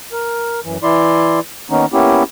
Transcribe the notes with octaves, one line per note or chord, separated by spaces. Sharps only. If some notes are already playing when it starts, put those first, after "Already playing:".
A#4
F#2 E3
E3 E4 D5 C6
D#3 A#3 B3 C#4 D#4
A#3 B3 C#4 E4 G4